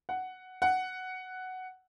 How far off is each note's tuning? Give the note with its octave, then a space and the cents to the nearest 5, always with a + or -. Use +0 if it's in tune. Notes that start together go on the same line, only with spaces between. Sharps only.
F#5 +5
F#5 +5